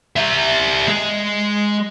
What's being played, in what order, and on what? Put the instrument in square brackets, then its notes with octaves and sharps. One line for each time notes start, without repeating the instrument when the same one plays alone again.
[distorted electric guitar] G3 E5
G#3